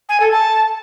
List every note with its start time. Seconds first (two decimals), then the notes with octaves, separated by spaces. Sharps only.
0.09 G#5
0.20 A4
0.31 A5